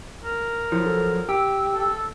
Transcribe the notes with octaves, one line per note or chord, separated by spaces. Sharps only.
A#4
F3 F#3 E4
A4
G4 E6
A4